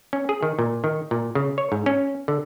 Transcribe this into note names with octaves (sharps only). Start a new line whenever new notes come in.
C#4
G#4
D#3
A#2
D#3
A#2
C#3
C#5
G#2
C#4
D3